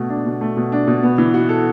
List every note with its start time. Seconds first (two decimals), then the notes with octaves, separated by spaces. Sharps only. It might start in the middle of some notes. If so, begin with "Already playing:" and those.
Already playing: B2 A3
0.09 D4
0.26 B2
0.41 A3
0.57 B2
0.72 D4
0.87 B2
1.03 B3
1.18 E3
1.34 F#4
1.49 A4